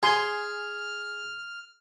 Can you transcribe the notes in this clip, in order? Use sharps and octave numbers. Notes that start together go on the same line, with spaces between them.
G#4 G#5 C6 F6